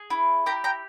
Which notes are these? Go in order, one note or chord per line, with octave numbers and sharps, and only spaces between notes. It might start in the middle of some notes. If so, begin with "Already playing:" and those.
Already playing: G#4
E4
G4 G5 A#5
G5 A#5